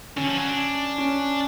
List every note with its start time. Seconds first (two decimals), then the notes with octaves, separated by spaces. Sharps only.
0.17 D3 C#4
0.27 F3
0.37 F#3
0.47 D4
0.98 C#4